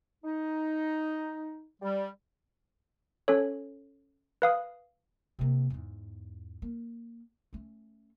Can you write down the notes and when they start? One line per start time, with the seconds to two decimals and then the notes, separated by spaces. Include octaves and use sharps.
0.24 D#4
1.81 G3
3.28 C#4 A4 C#5
4.42 B4 F5 D#6
5.39 C3 A#3
5.70 E2 G#2
6.62 A#3
7.53 A3 C#4